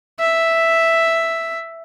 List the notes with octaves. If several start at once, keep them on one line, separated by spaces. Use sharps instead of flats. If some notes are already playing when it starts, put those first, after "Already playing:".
E5